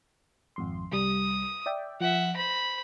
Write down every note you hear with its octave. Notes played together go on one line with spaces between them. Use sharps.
G#1 F2 C6
C2 G3 D#6
D5 E5 G5
F3 E5 F#5
C5 B5 A#6